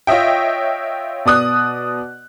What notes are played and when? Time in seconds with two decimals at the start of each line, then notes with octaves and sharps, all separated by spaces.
0.07 F4 C#5 D#5 E5 G5
1.25 B2 D5 D#6 F#6